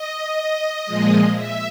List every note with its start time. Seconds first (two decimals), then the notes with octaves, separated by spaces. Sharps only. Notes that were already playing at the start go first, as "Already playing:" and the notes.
Already playing: D#5
0.86 A#2 F3 G#3
1.35 E5